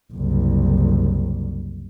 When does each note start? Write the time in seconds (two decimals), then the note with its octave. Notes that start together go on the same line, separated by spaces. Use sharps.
0.12 F#1 C2